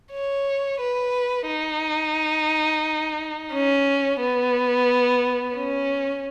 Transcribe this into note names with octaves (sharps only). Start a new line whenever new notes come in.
C#5
B4
D#4
C#4
B3
C#4